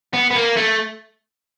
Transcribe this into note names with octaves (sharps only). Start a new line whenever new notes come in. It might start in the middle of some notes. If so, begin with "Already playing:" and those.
B3
B3
A#3
A3